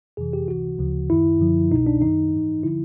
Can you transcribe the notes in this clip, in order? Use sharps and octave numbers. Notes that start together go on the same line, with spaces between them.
F2 C3 E3 G#4
G4
C#2 C3 E3 F#4
D2 C#3 F3
F#2 D#3 E4
F#2 D3 F3
C2 B2 D#4
D4
F#2 D#3 D#4
G#2 E3
D3 F3 E4